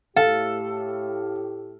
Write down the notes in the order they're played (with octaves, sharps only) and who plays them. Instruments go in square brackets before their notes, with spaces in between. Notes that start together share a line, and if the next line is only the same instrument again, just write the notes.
[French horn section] A2 G4 [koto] A4 [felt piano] F5